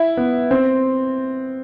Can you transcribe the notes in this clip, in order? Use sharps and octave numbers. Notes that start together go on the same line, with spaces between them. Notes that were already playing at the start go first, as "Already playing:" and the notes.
Already playing: E4
B3
C4